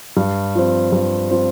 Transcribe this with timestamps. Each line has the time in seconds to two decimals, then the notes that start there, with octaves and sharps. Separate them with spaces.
0.17 G2
0.55 F3 C4
0.92 G2
1.31 F3 C4